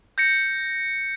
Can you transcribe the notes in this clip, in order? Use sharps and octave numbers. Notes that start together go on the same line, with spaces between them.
G6 A#6 C#7